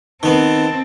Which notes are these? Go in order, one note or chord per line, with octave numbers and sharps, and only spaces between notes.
D#3 B3 C4 A5